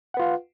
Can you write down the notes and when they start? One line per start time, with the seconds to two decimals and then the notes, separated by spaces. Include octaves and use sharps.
0.14 F#5
0.17 B4
0.20 F4
0.22 F5